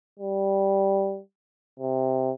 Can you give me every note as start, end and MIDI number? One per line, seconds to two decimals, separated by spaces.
0.19 1.20 55
1.80 2.31 48